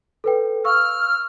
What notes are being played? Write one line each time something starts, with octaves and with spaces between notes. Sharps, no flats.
A4 B4 G5
F5 C#6 E6 F6